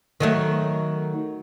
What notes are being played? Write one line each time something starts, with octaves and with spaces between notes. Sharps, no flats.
D#3 F#3 A3